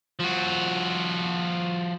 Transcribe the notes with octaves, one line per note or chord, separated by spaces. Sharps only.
F3 F#4